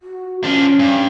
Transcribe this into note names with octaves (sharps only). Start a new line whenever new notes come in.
F#4
F3 C#4 D4
G2